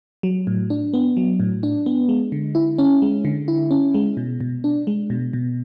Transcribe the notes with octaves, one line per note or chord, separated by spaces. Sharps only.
F#3
A2
D4
B3
F#3
A2
D4
B3
G#3
D3
E4
C#4
G#3
D3
E4
C#4
G#3
B2
B2
D4
G#3
B2
B2